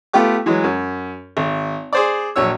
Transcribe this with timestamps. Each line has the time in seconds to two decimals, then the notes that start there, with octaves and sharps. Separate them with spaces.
0.13 A3 B3 F4 G4 D6
0.46 E3 F#3 G#3
0.64 F#2
1.37 G#1
1.93 G#4 C5 D5
2.36 A#1 F#3 C#5 E6